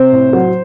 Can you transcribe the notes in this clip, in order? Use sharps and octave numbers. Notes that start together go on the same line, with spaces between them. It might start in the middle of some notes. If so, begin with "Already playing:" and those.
Already playing: C3 C5
A2
F#3